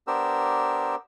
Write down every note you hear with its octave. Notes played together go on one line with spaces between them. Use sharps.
B3 D4 G4 A#4 C5 E6